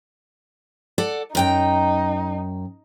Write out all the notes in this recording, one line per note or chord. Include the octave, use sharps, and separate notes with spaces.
A4 D5 F#5
F#2 D#4 G5 A#5